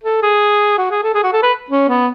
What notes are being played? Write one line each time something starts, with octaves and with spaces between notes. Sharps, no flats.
A4
G#4
F#4
G#4
A4
G#4
F#4
A4
B4
C#4
B3